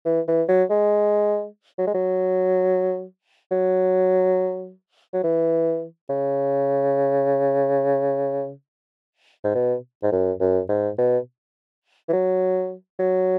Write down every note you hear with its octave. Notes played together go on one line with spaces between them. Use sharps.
E3
E3
F#3
G#3
F#3
G#3
F#3
F#3
F#3
E3
C#3
G#2
B2
G#2
F#2
F#2
G#2
B2
E3
F#3
F#3